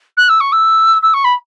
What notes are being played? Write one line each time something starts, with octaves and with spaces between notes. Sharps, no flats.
F#6
E6
C#6
E6
E6
C#6
B5